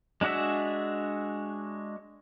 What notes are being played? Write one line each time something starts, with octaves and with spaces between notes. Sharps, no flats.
G#3 D4 F#4 G#4 E5